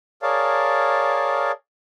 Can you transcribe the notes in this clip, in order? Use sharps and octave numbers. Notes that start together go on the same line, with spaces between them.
G#4 A#4 C#5 D5 F5 A5